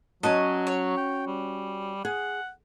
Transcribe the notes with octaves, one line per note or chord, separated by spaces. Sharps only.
F#3 C#4 F#4 D#5 A5
C#5
G5
G3
G#4 F#5